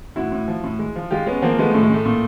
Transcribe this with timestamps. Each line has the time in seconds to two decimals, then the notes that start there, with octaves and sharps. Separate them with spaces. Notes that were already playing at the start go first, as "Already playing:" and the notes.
0.16 A2 E4 F#4
0.32 A2
0.48 F3
0.64 A2
0.79 G#3
0.96 F3
1.11 G#3 F4 G4
1.26 G#3 B3 C#4
1.42 F3 A#3 C4
1.58 G#3 A3 B3
1.70 A2 A3
1.83 G#3
1.90 A2 A3
2.05 A#2